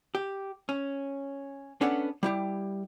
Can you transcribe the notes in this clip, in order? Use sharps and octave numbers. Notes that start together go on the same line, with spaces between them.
G4
C#4
B3 C#4 D4 A4 C#5 F#5
G3 E4 G4